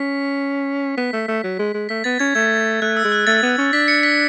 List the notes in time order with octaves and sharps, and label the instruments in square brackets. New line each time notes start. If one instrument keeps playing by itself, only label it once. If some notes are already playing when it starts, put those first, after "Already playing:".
Already playing: [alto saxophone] C#4 [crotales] B6
[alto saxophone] B3 [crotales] B6
[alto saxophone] A3
A3
F#3
G#3
G#3
[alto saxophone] A3 [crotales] B6
[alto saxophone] B3 [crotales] A6
[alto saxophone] C#4 [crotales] G#6
[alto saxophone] A3 [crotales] G#6
[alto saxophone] A3 [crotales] F#6
[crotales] E6
[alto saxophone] G#3
[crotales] F#6
[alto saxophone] A3 [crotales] A6
[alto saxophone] B3
C#4
[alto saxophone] D4 [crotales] B6
[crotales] C#7
B6